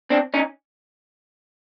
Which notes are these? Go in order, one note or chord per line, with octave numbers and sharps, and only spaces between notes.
C4 D4
C#4 D#4